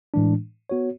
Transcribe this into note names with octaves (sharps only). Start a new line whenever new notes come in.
A2 E3 G#3 D4
B3 F#4 C#5